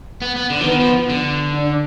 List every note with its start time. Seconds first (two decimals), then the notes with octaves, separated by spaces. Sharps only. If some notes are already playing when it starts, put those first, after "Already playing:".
0.22 B3
0.36 B3
0.50 D3
0.61 F3
0.65 D#3 B3
0.80 F3
1.10 D3
1.54 D4